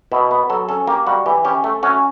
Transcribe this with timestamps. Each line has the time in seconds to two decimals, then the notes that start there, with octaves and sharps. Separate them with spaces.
0.12 B2 E4
0.31 B3
0.50 F#3 A4
0.69 C#4 A4
0.87 A#3 G4
1.07 G3 F#4
1.26 E3 G4
1.45 C#4 G4
1.64 A3
1.83 C#4 F#4